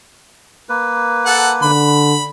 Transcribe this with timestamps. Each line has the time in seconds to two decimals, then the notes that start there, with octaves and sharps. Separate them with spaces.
0.69 A#3 B4
1.26 A4 F#5
1.62 D3 B5